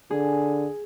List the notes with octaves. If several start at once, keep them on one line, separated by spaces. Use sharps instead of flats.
D3 G#4